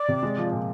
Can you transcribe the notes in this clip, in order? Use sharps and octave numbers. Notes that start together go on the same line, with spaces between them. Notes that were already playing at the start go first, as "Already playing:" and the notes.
Already playing: D5
C3
G#3
F3
A#2